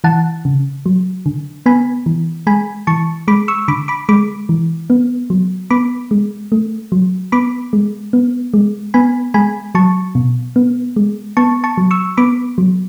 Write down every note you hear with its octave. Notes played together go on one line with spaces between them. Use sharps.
E3 F#5 A5
C#3
F#3
D3
B3 G#5 B5
E3
G#3 G#5 B5
E3 A5 C#6
G#3 B5 D6
C#6 E6
D3 B5 D6
B5 D6
G#3 B5 D6
E3
B3
F#3
B3 B5 D6
G#3
A3
F#3
B3 B5 D6
G#3
B3
G#3
B3 G#5 B5
G#3 G#5 B5
F#3 A5 C#6
B2
B3
G#3
B3 A5 C#6
A5 C#6
F#3
C#6 E6
B3 B5 D6
F#3